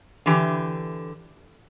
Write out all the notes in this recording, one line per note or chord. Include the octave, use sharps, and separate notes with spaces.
D3 E3 G4